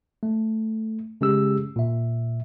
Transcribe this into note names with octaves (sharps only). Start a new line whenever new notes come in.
A3
C#3 G#3 C#4 G4 G#4 E6
A#2 E5